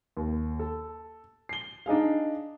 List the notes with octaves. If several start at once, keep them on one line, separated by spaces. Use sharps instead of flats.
D#2
A4
C7 G7
D4 D#4 G#4 F5